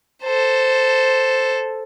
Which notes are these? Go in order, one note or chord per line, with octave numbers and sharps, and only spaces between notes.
A4 C5